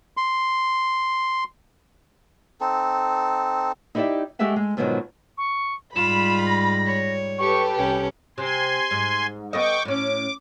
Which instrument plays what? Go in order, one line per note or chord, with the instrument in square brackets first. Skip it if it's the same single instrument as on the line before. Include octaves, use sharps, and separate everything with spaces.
[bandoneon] C6
[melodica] C4 D#4 A4
[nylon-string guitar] D#4 E4 G4 C#5 D5 E5
G#3 A3 G4 G#4 E5 F#5
G#3
G#2 B2 D#3 F3 F#3 G#3
[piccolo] C#6
[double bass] G#2 G3 [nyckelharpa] F4 [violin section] B5 [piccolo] E7
[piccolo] A#6
[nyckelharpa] C#5
[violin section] G4 A4 B4 [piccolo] C#6
[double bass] C2 [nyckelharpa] C#4 [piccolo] G5
[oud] C3 [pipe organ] G#5 C6
[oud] G#2
[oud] B3 A4 D#5 [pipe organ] G5 C#6 D6
[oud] A2 C#4 [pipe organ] D6